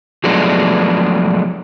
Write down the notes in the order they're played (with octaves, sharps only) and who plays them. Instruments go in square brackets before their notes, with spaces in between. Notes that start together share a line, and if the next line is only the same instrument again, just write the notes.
[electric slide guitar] F3 F#3 G#3 A3 B3 D4